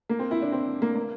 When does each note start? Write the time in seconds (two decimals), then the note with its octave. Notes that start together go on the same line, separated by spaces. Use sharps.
0.09 A#3
0.19 C4
0.31 E4
0.42 D4
0.52 C4
0.82 A#3
0.95 A#3